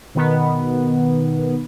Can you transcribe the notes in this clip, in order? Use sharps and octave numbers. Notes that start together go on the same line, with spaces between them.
B2 D#3 B3